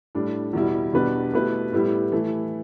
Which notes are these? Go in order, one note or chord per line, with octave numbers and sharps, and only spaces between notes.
A2 G3 D4
E2 B2 G3 E4
E2 B2 G3 D4 B4
B2 A3 E4 G4 B4
A2 G3 B3 E4 G4
E3 A3 E4